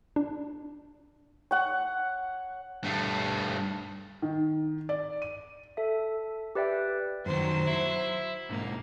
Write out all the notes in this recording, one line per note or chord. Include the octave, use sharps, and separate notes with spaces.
D4
C#5 F#5 G5
G2 A3
D#3
D5
D#7
A4 E5
G4 B4 D5 E5 G5
F#2 D#3 F#3 C5
E4
B1 G#2 A#3